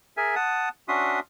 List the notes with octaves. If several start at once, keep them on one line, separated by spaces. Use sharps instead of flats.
G#4 A#4 E5 G#5
F#5 A5 D#6
C#4 D4 F#4 E5 C6 D#6